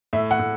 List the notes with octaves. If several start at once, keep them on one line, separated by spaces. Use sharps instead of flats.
A2 E5
F#5
A2